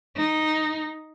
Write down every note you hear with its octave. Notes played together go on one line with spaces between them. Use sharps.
D#4